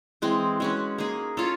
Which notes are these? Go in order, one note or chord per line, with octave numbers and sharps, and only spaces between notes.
E3 G#3 C4
G#3 C#4 F#4 B4
A#3 D#4 G#4
C#4 F4 A4 C#5